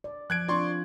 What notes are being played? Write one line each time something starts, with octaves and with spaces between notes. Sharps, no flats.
D5
F3 F#6 G#6 D7
C4 D4 F4 D5 C6 C#6